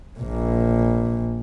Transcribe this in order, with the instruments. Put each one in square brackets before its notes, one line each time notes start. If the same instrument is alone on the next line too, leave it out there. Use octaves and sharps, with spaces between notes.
[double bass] A#1 A#2